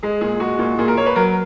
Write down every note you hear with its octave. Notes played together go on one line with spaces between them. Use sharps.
G#3 G#4
A#2 G#4
G#3 F#4
A#2
A#2 G#4
A#4
A#3 C#5
B4
F#3 A#4